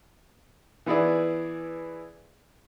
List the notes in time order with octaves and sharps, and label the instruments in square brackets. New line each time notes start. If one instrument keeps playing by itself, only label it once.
[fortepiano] E3 B3 E4 G#4 D5